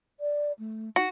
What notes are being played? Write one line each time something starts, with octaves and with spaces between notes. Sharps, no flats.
D5
A3
D#4 F#4